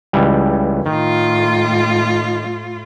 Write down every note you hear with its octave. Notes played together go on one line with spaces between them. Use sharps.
C#2 E3 G3
A2 D#3 F4